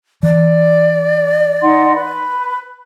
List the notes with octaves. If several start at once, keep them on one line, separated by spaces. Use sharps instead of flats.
E3 D5
D#4 F#5 C6
B4 B5